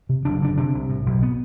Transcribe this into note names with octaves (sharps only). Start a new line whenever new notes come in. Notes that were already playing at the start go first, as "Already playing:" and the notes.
C3
F#1 D4
D3 D4
C3 D4
C2
A2
B1
B3